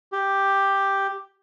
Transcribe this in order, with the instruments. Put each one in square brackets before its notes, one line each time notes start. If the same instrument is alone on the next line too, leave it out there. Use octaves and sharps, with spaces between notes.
[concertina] G4